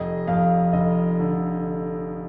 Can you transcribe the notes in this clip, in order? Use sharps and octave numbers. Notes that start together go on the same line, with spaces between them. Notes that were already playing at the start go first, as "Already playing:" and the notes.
Already playing: F1 D#5
F2 F5
F1 D#5
D3